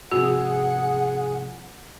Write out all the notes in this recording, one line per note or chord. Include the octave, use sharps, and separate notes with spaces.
G#2 C3 F3 F#4 G#4 F#5